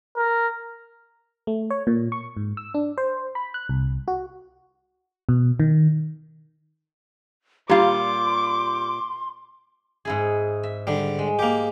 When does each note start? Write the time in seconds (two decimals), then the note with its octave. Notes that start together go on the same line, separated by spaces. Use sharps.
0.17 A#4
1.47 A3
1.70 C#5
1.87 A#2
2.12 C#6
2.37 G#2
2.57 E6
2.74 D4
2.98 C5
3.35 B5
3.54 F#6
3.69 C2
4.08 F#4
5.29 B2
5.60 D#3
7.69 A#2 G3 F4 C6 D6
10.05 G#2 E4 G#4
10.63 E5
10.87 D3 G3
11.19 G#3
11.39 A#3 G4